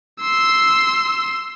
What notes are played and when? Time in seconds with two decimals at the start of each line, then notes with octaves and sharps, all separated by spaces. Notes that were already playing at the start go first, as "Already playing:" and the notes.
0.21 C6 E6